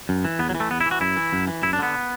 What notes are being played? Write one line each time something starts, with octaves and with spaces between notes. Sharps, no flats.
F#2
E3
E2 B3
F#3
E3
A3
E2 B3
E4
E3 F#4
F#2 E4
E3
F#2
E3
F#2 E4
D4
D3 B3